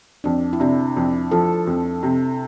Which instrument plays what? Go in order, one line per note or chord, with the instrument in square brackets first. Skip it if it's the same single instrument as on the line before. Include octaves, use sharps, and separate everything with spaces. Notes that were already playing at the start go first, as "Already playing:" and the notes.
[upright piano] F2 [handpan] D4
[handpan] E4
[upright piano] C3 [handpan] D4
[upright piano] F2
[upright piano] F3 [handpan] A4
[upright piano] F2
C3